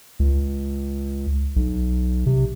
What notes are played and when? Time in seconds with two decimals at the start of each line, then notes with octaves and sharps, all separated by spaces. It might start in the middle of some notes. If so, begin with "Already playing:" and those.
0.20 C#2
1.56 B1
2.26 C3